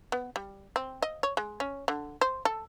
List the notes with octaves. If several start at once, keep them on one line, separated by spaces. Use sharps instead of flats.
B3
G3
C4
D#5
C#5
G#3
C#4
D3
C5
A4